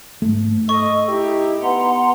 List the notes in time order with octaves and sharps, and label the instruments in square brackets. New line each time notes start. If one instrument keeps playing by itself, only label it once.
[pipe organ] G#2 [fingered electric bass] A3
[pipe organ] A4 [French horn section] D#5 [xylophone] C#6
[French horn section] D#4 E4 G4
[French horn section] B3 [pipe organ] F#5 A#5 C6